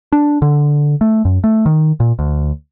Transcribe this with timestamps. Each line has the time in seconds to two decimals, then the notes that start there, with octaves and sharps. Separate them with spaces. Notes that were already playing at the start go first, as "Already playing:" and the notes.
0.12 D4
0.42 D3
1.01 A3
1.25 F#2
1.44 A3
1.66 D#3
2.00 A#2
2.19 D2